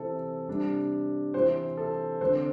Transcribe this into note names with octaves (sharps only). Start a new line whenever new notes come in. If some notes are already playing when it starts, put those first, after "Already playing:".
Already playing: C3 E3 C4 A4
C3 G3 D4
C3 E3 C4 C5
A4
D3 C4 C5